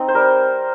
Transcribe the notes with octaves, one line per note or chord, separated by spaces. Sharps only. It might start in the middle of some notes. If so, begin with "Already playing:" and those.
Already playing: C4 D#4
C5
G3 A#4